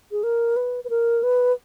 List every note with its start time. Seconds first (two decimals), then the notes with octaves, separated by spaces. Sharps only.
0.12 G#4
0.23 A#4
0.56 B4
0.84 B4
0.90 A#4
1.23 B4